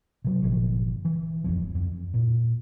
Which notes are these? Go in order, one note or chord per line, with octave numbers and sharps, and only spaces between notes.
C3 F#3
G1 A#2 F3
E3
D1 B1 F2 F3
F2
A#2